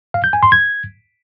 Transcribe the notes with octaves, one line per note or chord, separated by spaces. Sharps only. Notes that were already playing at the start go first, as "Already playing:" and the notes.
F5
G6
G#5
C6
G#6